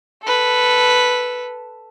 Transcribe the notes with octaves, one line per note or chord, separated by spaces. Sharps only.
A4 B4